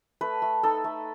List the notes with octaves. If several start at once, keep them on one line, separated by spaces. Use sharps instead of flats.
A3 B4
A3
D#4 A4
A3